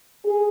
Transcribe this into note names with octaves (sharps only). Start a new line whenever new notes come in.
G#4